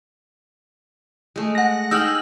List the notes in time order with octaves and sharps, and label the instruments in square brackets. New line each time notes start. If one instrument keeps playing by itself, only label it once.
[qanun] G#3 A3
[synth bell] F#5 A#6
[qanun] D#4 G#4 G5 [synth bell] E6 F6 F#7